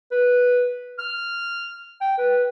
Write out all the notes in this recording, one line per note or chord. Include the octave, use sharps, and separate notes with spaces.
B4
F6
G5
B4